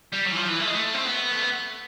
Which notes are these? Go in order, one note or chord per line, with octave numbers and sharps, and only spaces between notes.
G3
F#3
E3
F3
E3
A3
G#3
A3
C4
B3
A3